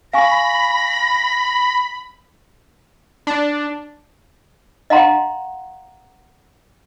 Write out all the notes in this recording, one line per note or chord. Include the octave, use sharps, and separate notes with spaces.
F5 G#5 B5 C#6 A#6
D4
D#5 F5 F#5 A#5 C6